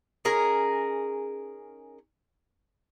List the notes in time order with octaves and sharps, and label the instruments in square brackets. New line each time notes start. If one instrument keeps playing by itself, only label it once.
[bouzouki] C#4 D#4 G#4 A#4